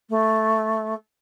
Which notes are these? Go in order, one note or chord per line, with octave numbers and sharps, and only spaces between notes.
A3